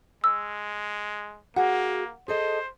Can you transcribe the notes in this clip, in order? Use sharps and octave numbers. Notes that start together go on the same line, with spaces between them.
G#3 E6
A#3 F#4 G#4 F#5
G#4 A4 C5 D#5